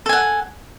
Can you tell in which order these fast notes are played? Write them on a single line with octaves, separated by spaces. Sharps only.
A4 G#5 F#5